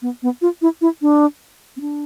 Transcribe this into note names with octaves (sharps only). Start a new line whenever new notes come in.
B3
B3
F4
E4
E4
D4
C4
D4